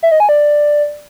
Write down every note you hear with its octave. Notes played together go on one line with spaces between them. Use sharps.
E5
D#5
G#5
D5